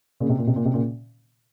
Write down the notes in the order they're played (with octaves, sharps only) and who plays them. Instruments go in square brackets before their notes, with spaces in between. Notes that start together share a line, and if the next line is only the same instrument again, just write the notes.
[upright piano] A#2 C#3
C3
A#2
C3
A#2
C3
A#2 C#3